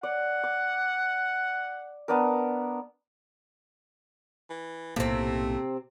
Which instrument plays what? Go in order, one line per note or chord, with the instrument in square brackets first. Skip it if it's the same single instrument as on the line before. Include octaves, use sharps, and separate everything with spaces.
[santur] D5 [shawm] F#5
[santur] D6
B3 D4 A#4
[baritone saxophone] E3
[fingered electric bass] B1 A2 A#3 [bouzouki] C3 C4 [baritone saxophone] A3